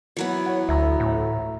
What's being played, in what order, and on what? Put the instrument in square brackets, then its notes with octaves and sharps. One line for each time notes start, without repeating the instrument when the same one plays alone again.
[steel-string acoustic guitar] E3 F#3 B3
[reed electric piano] C#5 F#5
[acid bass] D2 [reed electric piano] E5 A#5
[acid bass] A2